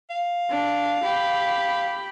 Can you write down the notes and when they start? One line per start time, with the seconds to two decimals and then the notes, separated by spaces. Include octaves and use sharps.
0.10 F5
0.49 D4
1.03 G4 B5